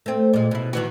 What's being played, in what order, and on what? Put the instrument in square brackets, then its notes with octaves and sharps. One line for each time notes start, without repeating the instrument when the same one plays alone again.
[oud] A3 C4
A#2 G#3
B2 E4
D#3 E3 F#4